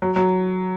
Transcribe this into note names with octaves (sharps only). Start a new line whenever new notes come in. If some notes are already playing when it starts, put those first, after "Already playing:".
F#3
F#3